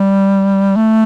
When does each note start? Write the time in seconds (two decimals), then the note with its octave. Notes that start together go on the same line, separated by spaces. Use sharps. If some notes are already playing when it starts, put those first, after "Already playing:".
Already playing: G3
0.76 A3